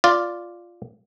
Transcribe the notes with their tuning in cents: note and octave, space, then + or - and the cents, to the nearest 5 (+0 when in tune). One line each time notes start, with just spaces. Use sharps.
F4 +0 D5 +0